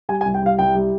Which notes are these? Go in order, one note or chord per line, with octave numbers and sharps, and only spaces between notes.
G3 G#5
G#5
C2
G5
G3 F5
C2 G5
G3